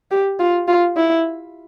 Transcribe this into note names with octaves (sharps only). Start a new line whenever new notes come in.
G4
F4
F4
E4